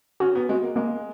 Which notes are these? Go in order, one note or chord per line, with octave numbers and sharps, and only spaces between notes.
C#4 F#4
B3
G#3 F#4
A#3
G#3 A#3